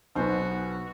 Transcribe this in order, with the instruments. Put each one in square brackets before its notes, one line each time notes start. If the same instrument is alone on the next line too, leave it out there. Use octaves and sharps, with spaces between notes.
[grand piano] B1 B3 [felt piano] D#4 C5 G#5 [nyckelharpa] F#4